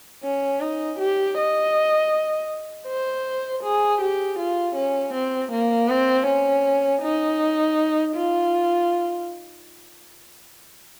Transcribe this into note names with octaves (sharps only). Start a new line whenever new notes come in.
C#4
D#4
G4
D#5
C5
G#4
G4
F4
C#4
C4
A#3
C4
C#4
D#4
F4